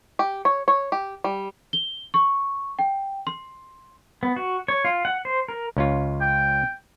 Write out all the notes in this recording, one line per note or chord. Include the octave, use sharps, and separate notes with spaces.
G4
C#5
C#5
G4
G3
G7
C#6
G5
C6
B3
F#4
C#5
F4
F#5
C5
A#4
C#2 C#4 F4
G5